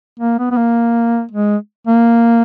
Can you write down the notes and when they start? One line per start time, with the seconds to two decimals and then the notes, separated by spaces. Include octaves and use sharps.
0.20 A#3
0.39 B3
0.51 B3
0.57 A#3
1.32 G#3
1.88 A#3